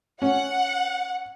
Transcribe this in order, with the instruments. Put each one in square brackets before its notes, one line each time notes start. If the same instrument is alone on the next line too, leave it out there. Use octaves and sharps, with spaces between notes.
[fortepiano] C#4 [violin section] F#5